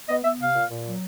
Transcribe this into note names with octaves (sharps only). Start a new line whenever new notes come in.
B3 D#5
B3 E5
C3 F5
A#2
A#2
F#3